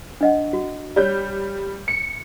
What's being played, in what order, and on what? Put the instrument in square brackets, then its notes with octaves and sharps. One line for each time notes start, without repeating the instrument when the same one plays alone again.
[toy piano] D4 D#5 F#5
F#4
[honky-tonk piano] G3 G6 [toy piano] C#5 D5
[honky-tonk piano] C#7